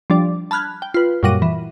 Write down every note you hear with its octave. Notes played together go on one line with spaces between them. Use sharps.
F3 G3 D4 D5
A5 B5 F6 F#6 G#6
G5
F4 B4
F#2 A#2 G3 F#5 A#6 D#7
E3